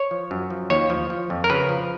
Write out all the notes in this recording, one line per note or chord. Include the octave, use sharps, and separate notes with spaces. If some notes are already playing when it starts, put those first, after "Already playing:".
Already playing: C#5
F3
F#2
F3
D#2 C#5
F3
F3
F2
A#4
C#3 B4
F3